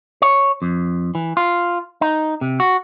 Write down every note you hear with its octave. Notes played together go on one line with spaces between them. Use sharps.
C#5
F2
E3
F4
D#4
C3
F#4